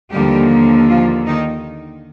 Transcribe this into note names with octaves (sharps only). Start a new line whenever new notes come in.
D#2 D3 F3 G3 A#3 G4
F3 F4
D#3 D#4